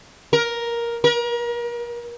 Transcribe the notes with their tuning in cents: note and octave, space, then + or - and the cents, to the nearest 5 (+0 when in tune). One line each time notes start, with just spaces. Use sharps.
A#4 +10
A#4 +35